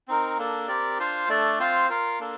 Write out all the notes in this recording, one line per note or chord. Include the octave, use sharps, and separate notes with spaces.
C4 D#4 A#4
A#3 D4 A4
C4 G4 A#4 D5
D4 F4 C5 F5
A3 D4 A4 D5
C4 F4 C5 F5
F4 A#4 F5
A#3 D4 A4